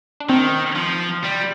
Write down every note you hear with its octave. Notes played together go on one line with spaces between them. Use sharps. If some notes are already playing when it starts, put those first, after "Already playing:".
D4
D#3 C4
F3
G3